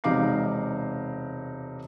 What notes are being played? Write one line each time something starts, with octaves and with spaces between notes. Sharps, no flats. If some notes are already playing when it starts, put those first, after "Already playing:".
E1 C3 D#4 F5 D6 C7